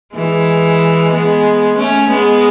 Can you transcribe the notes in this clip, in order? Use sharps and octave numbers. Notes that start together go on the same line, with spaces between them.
E3 G#3
G#3 B3
A3 C#4
G#3 B3